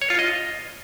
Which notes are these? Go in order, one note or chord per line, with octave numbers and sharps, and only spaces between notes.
C#5
F4
D#5